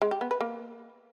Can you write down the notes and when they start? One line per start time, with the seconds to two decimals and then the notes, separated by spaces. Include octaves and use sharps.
0.02 G#3
0.11 G4
0.21 B3
0.31 B4
0.41 A#3